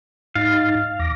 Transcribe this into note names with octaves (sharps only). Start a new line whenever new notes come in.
G#2 D#4 F5 A6
E2 D6 A#6